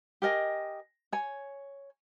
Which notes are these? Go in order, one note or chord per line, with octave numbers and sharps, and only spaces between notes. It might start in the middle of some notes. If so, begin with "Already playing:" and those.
G4 A#4 D#5 G#5
C#5 G#5